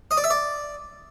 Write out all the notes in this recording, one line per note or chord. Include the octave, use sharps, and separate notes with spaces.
D#5
D5
E5
D5